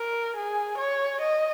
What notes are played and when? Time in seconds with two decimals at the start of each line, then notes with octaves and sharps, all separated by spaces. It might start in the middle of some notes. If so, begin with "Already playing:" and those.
Already playing: A#4
0.37 G#4
0.78 C#5
1.21 D#5